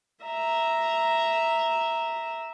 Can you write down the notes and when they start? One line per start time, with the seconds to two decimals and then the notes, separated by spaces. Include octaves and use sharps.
0.25 E5 A#5